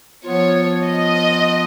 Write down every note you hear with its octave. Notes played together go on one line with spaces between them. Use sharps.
F3 B3 F4 C#5
D#5